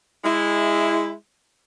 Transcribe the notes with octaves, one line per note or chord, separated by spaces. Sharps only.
G#3 E4